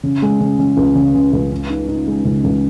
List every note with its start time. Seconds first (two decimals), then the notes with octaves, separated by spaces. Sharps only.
0.03 C#3
0.22 G#3
0.40 C#3
0.59 C#3
0.77 C#2
0.95 C#3
1.14 C#3
1.33 C#2
1.51 C#3
1.70 D#4
1.88 D#4
2.07 G#3
2.25 C#2
2.44 C#2